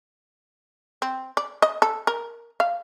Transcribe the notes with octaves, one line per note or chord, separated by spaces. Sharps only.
C4
D5
D#5
A4
A#4
F5